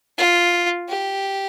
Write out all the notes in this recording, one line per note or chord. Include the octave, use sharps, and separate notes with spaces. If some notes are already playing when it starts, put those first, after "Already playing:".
F4
G4